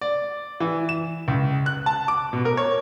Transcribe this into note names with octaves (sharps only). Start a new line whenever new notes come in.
D5
E3
E7
C#2
F#6
A5
D6
B2
A#4
C#5